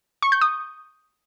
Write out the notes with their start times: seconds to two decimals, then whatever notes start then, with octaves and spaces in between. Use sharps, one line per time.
0.22 C#6
0.32 G6
0.41 D#6